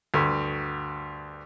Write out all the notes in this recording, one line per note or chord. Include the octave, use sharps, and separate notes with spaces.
D2 G2